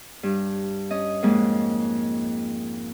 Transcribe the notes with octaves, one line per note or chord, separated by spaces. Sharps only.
G2
C#4 D#5
F2 G#2 G#3 A#3